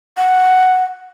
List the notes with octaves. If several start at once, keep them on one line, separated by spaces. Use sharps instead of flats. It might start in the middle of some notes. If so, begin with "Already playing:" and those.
F#5